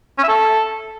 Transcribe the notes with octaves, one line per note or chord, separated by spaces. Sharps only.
C#4
E5
A4